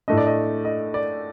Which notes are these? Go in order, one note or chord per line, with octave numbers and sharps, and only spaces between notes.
A2 A3 D4 D#5
D5
D#5
D#5
D5